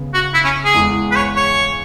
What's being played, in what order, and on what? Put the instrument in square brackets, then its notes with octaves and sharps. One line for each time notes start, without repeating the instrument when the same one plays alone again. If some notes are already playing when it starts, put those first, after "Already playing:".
Already playing: [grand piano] C#3 B3
[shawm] F#4
E4
C#4
G#4
[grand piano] E2 E3 G#3
[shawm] B4
C#5
C#5